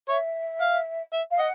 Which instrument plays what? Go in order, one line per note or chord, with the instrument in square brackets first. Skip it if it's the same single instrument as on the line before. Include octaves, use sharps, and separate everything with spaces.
[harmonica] C#5 [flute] E5
[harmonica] F5
E5
[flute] F5
[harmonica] D#5 [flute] F#5